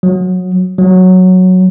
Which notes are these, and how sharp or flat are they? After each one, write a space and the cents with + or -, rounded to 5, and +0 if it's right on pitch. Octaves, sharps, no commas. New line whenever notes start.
F#3 -20
F#3 -5